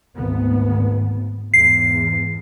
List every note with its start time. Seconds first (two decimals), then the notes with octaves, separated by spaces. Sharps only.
0.16 G#1 D2 B3
1.54 E2 G#2 C7